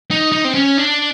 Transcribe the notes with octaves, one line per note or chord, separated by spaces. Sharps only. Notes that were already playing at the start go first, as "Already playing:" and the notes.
D#4
D#4
C4
C#4
D4